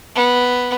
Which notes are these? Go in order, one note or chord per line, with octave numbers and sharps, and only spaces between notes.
B3